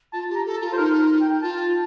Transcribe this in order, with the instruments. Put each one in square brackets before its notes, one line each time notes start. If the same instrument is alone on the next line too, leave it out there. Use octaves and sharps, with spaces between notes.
[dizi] F4 [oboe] A5
[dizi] G4
[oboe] A#5
[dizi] A4
[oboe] A5
[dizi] F4
[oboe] C5
[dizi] D#4 [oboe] A#4
[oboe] A#4
G5
[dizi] F4 [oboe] A5